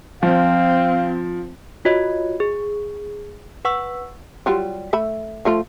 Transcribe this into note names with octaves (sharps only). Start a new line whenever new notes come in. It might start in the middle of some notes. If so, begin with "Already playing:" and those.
F3 C4 F5
F4 F#4 C#5 D#5
G#4
B4 F#5 C#6 E6
F#3 G3 F4
A3 E5 B5
F3 A3 F4